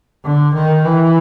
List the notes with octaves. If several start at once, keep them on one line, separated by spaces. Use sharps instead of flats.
D3
D#3
E3